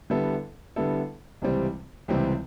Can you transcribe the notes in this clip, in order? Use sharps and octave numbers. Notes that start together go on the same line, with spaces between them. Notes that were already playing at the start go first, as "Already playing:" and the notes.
D3 G3 B3 E4 A4
D3 G3 B3 E4 A4
C#2 C3 E3 G3 C4
C#2 C3 E3 G3 C4